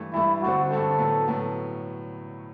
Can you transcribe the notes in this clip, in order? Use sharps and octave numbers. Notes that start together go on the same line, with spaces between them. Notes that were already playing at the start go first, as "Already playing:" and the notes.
Already playing: G2 E3 A3
G2 E3 A3 E4
G2 D3 A3 C4 F#4
G2 D3 A3 C4 A4
A2 F#3 B3
A2 F#3 B3